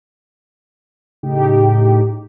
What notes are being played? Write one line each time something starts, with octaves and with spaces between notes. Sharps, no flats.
A2 C#3 D#4 G4